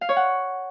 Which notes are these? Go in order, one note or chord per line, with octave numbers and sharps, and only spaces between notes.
F5
C#5
F#5